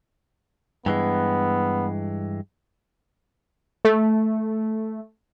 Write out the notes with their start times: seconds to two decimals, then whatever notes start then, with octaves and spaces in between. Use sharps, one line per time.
0.86 G2 E3 G#3 B3
3.85 A3